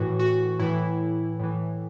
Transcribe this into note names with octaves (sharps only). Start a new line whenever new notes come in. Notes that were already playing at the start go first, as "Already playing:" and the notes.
Already playing: A2 E3 F#4
F#4
A2 E3 E4
A2 E3